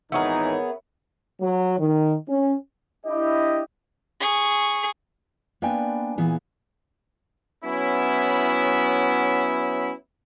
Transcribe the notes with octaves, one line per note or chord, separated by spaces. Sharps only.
G#1 E3 B3 D#4 G#4 A#4 C#5 E5
F#3
D#3
C#4
D4 E4 G4 D#5
G#4 C#6
A#3 B3 D4 B4 G5 G#5
A#2 E3 B3 G#4
F#3 B3 C#4 E4